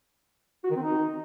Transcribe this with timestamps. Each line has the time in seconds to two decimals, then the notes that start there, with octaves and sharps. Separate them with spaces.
0.64 F#4
0.70 D#3
0.76 C4
0.82 D#4